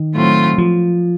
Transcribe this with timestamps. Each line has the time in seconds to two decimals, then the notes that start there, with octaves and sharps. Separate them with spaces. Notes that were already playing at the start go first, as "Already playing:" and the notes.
Already playing: D#3
0.14 A2 F#3 A3 C4 F4
0.58 F3